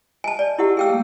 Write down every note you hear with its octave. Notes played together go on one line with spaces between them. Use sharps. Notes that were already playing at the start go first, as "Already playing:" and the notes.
D#5 G#5 A5
D5
E4 G4 F#5 E6
A3 G4 G#4 F5 G5 E6
G3 A#3